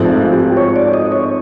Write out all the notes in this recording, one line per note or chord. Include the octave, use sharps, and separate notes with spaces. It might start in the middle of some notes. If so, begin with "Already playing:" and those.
Already playing: G#1 G#2 F3 A3 C4
F4
G4
C#5
D5
D#5
C#5